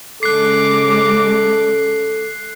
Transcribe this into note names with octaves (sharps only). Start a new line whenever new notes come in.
C#3 G#3 A4 D6 F#6 C7